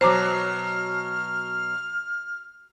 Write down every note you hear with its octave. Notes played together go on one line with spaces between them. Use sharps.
B2 F#3 C5 A#5 D6 F6